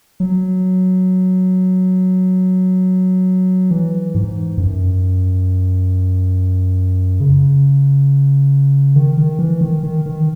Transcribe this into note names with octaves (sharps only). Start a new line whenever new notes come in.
F#3
E3
G#2
F#2
C#3
D#3
D#3
E3
D#3
D#3
D#3